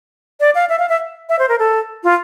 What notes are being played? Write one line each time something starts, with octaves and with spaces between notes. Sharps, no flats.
D5
F5
E5
F5
E5
E5
C5
A#4
A4
F4